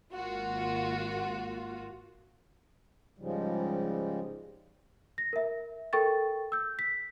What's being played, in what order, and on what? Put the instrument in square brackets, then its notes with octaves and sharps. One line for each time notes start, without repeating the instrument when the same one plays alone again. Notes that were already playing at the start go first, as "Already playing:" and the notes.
[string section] G#1 A#3 F4 F#4
[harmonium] G#2 C#3 F3 G3 G#3
[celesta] A#6
A#4 E5
A4 A#4 G5 C#6 A6
E6 G6
B6